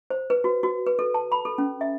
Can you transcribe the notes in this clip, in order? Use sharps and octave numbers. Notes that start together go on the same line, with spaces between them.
C5
B4
F#4
F#4
B4
A4
A5
B5
A4
C#4
E5